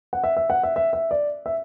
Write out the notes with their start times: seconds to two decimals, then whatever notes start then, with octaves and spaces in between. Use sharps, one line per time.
0.13 F#5
0.24 E5
0.37 E5
0.50 F#5
0.63 E5
0.76 E5
0.93 E5
1.11 D5
1.46 E5